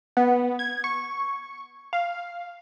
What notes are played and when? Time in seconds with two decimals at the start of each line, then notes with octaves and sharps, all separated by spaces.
0.17 B3
0.59 G#6
0.84 C#6
1.93 F5